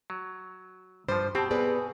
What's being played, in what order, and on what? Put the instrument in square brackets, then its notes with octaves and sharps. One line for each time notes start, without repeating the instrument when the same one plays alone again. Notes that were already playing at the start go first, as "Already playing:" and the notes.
[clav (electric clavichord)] F#3
[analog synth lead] G2 [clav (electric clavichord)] F3 G3 [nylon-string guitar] C5
[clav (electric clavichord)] B2 C4 [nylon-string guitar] G4 [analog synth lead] A5
[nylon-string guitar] B3 B4 D5 [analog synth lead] G#4